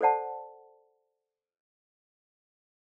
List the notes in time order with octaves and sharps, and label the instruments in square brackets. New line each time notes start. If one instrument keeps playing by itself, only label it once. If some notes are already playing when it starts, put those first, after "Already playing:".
[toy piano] A4 C5 D5 F#5 A5